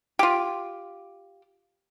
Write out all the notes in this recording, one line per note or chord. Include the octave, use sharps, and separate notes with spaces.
F4 G4